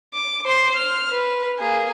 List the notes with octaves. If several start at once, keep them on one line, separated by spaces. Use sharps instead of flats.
D6
C5 C6
F6
B4
A#3 G#4